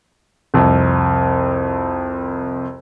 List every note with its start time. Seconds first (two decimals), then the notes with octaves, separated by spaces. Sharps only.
0.54 C2 F2